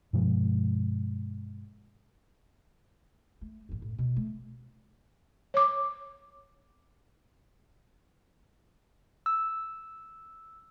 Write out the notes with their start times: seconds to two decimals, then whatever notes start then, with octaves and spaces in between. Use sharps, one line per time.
0.13 G2 B2 F3 G#3
3.41 A3
3.69 A1 F#2
3.82 A2
3.99 B2
4.17 A3
5.54 C#5 D6
9.26 E6